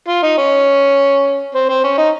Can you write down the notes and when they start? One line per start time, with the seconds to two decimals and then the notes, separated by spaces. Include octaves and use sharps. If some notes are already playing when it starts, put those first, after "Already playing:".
0.08 F4
0.23 D#4
0.38 C#4
1.54 C4
1.69 C4
1.84 C#4
1.98 D#4